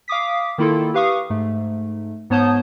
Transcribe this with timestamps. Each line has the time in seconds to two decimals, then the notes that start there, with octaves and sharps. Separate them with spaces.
0.08 F5 D6 D#6 B6
0.58 D#3 A#3 E4 F4 A4
0.94 G4 B4 F5 C#6 D#6
1.30 G#2 A3
2.30 G#2 B3 C#5 A5 D#6 G6